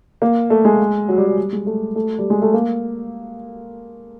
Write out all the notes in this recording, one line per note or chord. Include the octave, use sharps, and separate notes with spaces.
A#3
A3
G#3
F#3
G3
F#3
G3
G#3
A3
A3
G3
G#3
A3
A#3